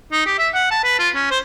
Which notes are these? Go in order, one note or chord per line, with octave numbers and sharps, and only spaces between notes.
D#4
G4
E5
F#5
A5
B4
F4
C#4
C5